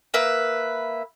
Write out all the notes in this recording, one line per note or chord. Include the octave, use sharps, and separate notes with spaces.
A#3 B4 E5